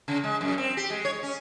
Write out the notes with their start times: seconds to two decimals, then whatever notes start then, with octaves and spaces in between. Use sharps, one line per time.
0.08 C#3
0.24 G#3
0.41 F#2
0.58 C4
0.77 G4
0.90 G#3
1.05 C#5
1.23 C#4